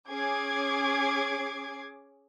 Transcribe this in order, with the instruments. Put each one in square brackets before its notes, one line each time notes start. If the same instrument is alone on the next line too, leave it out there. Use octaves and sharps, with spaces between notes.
[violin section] C#4 G#4 D6 G#6 C7